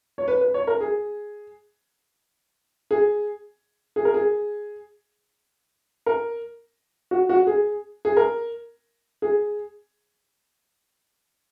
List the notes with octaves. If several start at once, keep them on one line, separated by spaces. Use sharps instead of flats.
C#5
B4
B4
C#5
A#4
G#4
G#4
G#4
A#4
G#4
A#4
F#4
F#4
G#4
G#4
A#4
G#4